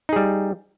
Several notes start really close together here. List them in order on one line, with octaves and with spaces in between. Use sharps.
D#4 G#4 G3